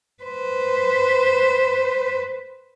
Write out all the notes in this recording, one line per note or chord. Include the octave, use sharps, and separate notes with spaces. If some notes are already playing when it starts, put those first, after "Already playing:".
B4 C5